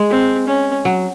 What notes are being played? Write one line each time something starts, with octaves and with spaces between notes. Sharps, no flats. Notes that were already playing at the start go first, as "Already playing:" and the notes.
Already playing: G#3
C4
C#4
F#3